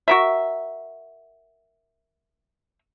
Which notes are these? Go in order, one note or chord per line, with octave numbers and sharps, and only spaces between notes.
F#4 A#4 E5